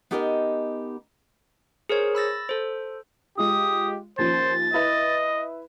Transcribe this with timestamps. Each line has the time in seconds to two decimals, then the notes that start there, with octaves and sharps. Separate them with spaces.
0.11 B3 D#4 G4 A#4 D#5 G#5
1.89 G#4 A#4 C5 C#5
2.15 B5 E6 A6 A#6
2.49 A4 C5
3.38 G#3 F4 G4 D#6
4.18 D#2 F3 C#4 C5 A6
4.74 E4 B4 D#5 E5